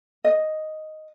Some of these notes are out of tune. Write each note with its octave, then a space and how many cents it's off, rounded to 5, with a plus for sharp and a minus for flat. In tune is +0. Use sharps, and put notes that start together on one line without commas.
D#5 +0